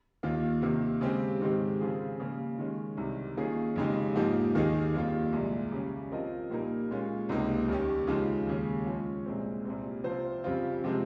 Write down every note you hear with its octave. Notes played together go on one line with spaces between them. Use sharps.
D#2 D#3 A#3 F4
C3 D#3 A#3
C#3 G#3 C4 G4
G#2 D#3 G#3 C4 G4
C#3 F3 C4 F4 G#4
C#3 G3 A#3
D#3 G#3 C#4
C2 C3 D#3
D#3 A#3 C#4 F4 G#4
F2 C#3 G#3 D#4 G4
G#2 F3 A#3 D#4 G4
D#2 D#3 A#3 D#4 G#4
F2 D#3 G3 A#3 F4
C2 A#2 G#3
C#3 G3 C#4 G4
F3 C4 F4 A#4 D#5
A#2 G3 A#3 D#4 A#4
A#2 G#3 C#4 F4
C#2 C3 G3 A#3 D#4
D#2 D#3 G3 C#4 G4
C#3 F3 G#3 D#4
D#2 C#3 G#3 C#4
F3 G#3 C#4
C2 A#2 G#3 C4
C2 A#2 G3 C4
C3 F3 C4 F4 C5
F2 C#3 G3 C4 F4
C3 F3 G#3 C4